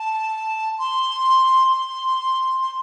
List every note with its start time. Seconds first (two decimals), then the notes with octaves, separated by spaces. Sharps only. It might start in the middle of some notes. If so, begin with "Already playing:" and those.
Already playing: A5
0.78 C6
1.73 C6
2.61 C6